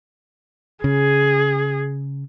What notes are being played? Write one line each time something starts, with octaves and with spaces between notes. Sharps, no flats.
C#3 G#4